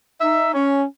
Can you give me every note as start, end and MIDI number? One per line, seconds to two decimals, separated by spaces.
0.21 0.53 63
0.21 0.53 76
0.54 0.83 61